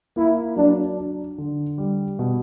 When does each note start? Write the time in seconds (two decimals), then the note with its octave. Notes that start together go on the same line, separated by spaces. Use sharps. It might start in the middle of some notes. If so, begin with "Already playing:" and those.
0.16 A#3 E4
0.56 F#3 D4
0.97 D4
1.38 D3
1.78 G3
2.19 B2